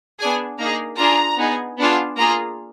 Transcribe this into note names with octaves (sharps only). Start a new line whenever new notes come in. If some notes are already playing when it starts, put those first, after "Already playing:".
B3 D4 G#4 G#5
A#3 D#4 G#4 A#5
D4 F4 G#4 A#5
B3 D#4 G#4
B3 D4 F4 G#4
A#3 F4 G#4 A#5